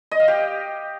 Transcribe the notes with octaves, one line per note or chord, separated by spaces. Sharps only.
D#5
F5
G4